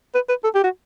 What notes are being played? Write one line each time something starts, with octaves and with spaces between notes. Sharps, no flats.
B4
B4
A4
G4
F#4